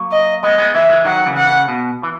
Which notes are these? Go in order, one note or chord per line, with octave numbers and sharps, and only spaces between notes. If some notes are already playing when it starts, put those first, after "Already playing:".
Already playing: F#3 A#3
D#5
G#3 B3 D#5
G#3 B3
E3 G#3 E5
E3 G#3
D#3 F#3 F#5
C#3 E3
F#5
C#3
B2
E3